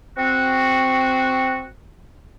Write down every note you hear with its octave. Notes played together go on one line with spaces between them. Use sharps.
C4 F#4